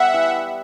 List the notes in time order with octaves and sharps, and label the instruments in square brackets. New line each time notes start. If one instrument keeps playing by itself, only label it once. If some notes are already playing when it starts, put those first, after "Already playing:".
Already playing: [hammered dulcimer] G3 B3 [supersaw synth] E5 F#5
[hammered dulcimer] E3